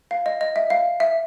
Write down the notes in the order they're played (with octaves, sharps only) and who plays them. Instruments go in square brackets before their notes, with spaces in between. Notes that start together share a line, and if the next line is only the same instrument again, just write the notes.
[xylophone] F5
D#5
D#5
E5
F5
E5